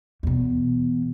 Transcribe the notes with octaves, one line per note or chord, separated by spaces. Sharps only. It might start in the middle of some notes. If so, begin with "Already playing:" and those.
E2 B2